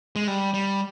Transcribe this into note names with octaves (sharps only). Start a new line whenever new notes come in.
G#3
G3
G3